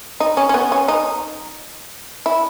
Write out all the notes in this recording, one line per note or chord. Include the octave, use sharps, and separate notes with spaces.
D#4
C#4
C#4
B3
C#4
D#4
E4